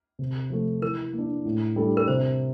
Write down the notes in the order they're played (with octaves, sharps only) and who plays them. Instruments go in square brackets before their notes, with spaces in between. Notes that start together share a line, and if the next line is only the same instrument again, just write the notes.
[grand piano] C3
F3 A3
[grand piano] E3 [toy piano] A#4
[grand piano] A#3
D4
A2
G3 D4 A4
[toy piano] A#4
[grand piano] C3 [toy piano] C5